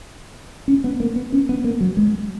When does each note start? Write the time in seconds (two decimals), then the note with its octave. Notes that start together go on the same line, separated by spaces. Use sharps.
0.68 C#4
0.84 B3
1.00 A#3
1.16 B3
1.32 C#4
1.49 B3
1.64 A#3
1.81 F#3
1.97 G#3